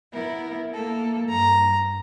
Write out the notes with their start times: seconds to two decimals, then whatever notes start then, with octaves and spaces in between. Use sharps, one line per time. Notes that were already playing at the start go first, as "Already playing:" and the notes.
0.13 B3 E4 A#4
0.74 A#3 A4
1.29 G2 A#5